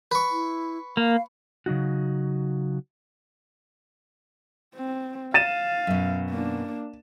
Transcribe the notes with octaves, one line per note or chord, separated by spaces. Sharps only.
B4 C#6
E4
A#3 F5
C#3 F#3 D#4 F#4
C4
F5 A6 D#7 E7
F#2 B2
A#3 D4